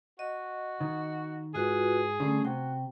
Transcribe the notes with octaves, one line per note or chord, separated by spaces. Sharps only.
F#4 D#5
D#3
G#2 F4 F#4 G#4 B4
D3 G3 A3 C#4
C3 F#4 G5